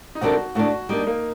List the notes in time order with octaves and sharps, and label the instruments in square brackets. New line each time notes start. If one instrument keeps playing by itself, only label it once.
[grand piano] D#4
[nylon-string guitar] C3 D#3 G3 D4 A4 [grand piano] F#4
[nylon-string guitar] A2 A3 D4 [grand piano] F#4
[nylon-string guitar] G3 A#3 D4 [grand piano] D#4
[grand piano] A#3